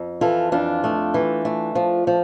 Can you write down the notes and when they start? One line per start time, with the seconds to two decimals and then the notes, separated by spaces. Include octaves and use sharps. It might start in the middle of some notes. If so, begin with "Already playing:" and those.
Already playing: F2
0.21 E3 F4 A4
0.52 F2 D4 F4
0.84 A3
1.14 E3
1.45 A3
1.75 F3
2.07 F3